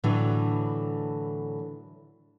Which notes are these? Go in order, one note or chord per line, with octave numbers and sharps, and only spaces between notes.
A2 D3 E3 F#3